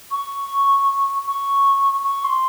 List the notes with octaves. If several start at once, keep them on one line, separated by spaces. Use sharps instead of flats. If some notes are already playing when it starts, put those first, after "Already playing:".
C#6
C#6
C#6
C6